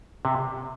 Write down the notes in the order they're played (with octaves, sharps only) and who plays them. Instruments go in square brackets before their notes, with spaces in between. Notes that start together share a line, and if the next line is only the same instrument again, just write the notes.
[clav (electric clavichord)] C3